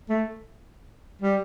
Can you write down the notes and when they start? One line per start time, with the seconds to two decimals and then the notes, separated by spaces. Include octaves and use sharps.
0.09 A3
1.22 G3